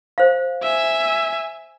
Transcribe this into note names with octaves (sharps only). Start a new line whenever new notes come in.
C5 F5
E5 G#5